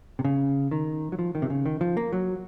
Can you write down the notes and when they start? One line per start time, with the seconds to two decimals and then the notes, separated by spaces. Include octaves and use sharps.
0.19 C3
0.25 C#3
0.71 D#3
1.12 F#3
1.19 F3
1.35 D#3
1.42 C3
1.50 C#3
1.66 D#3
1.81 F3
1.97 A#3
2.13 F#3